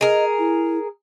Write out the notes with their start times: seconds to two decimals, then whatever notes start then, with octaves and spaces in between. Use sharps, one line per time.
0.01 G#4 A#4 D#5
0.39 E4